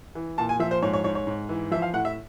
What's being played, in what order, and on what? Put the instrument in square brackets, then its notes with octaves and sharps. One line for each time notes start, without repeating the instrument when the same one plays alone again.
[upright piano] E3
A#2 A5
G#5
F3 E5
C5
G#2 C#5
C#5
G#2 C#5
C#5
G#2
E3
F3 E5
F5
A2 F#5
E5